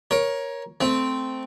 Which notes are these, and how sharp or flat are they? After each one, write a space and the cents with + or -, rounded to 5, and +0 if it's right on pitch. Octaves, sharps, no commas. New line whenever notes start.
A#4 +20 C#5 +0
A3 +0 C4 -10